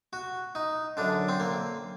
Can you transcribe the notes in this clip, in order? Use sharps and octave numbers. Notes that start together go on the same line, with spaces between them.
F#4
D#4
F#2 D3 D4
C4
A#3